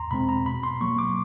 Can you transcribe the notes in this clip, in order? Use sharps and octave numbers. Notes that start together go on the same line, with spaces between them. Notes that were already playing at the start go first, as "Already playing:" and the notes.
Already playing: E2 A#5 C6
B2 G#3 C4 B5
A#5
B2 B5
C6
F#3 A#3 C#6
D6